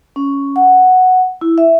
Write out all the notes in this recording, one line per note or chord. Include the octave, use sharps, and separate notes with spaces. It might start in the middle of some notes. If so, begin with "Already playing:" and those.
C#4
F#5
E4
E5